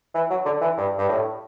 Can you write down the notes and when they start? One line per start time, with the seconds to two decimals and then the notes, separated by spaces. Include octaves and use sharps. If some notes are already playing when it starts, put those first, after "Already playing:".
0.14 E3
0.30 F#3
0.45 D3
0.61 E3
0.77 G2
0.98 G2
1.09 A2